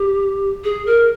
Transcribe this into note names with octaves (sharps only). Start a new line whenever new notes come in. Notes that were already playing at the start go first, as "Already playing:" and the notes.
Already playing: G4
G#4
A#4